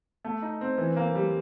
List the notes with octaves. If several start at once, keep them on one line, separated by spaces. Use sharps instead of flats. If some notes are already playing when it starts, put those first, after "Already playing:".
A3
D#4
C4
E3
A#3
G3